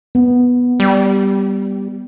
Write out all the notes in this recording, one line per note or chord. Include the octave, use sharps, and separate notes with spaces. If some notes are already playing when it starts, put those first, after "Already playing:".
B3
G3